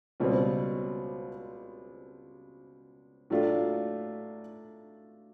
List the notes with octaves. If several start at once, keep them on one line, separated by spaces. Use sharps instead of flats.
C#2 B2 G3 C4
A2 F#3 A3 D4 F4